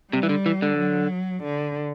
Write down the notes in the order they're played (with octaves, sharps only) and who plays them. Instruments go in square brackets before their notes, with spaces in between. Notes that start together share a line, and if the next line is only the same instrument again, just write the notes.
[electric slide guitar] C3 [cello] G3
[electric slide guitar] E3
D3
E3
D3
[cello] F#3
D3